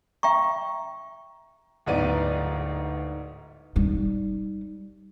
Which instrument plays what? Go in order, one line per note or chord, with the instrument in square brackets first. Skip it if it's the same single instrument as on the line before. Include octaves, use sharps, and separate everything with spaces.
[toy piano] E5 G5 A#5 C#6
[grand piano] D1 G#2 B3 D5 D#7
[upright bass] G3 D#4